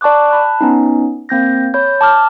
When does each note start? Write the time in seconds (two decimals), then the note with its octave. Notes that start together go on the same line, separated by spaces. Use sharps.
0.01 D5 A5 C#6 D6 F#6
0.31 A5 B5 F#6
0.61 B3 C#4 D#4
1.29 A#3 C4 G6 A#6
1.74 C#5 B5 G6
2.01 A5 D6 F6